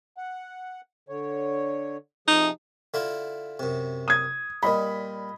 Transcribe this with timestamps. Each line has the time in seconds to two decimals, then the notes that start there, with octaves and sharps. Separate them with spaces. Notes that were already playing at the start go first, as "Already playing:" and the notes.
0.17 F#5
1.09 D3 C#5
2.28 C3 F3 D#4 G#4
2.94 D3 E4 F4
3.59 F#2 C3
4.08 D#6 G#6
4.63 A#2 G3 D#5 B5